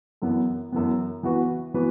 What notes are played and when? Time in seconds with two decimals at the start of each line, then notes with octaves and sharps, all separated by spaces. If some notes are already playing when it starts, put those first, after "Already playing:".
0.22 F#2 E3 B3
0.72 F#2 E3 B3
1.23 E3 B3 F#4 B4
1.74 E3 B3 F#4 B4